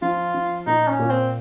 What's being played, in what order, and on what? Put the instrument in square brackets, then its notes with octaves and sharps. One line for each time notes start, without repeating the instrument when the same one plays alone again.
[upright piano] F3 [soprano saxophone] F4
[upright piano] F3
[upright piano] A#2 [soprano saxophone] D#4
[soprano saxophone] C#4
[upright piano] A#2
[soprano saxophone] C4